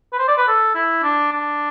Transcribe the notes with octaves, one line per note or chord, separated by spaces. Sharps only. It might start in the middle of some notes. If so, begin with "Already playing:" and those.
B4
C5
D5
B4
A4
E4
D4
D4